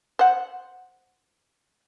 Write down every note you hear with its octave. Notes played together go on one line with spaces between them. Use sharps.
C5 F#5